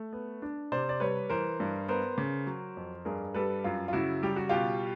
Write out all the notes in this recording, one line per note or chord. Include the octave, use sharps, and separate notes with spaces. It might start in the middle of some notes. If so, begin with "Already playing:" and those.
Already playing: A3
B3
D4
C3 C5 D5
D5
G3 B4 C#5
E3 A#4 C5
G2
B3 A#4 C5
C#3
F#3
F2
G2 G#4 A#4
G3 A4 B4
F#2 F4
F4
C#3 E4 F#4
G3 G4
F#4
B2 F4 G4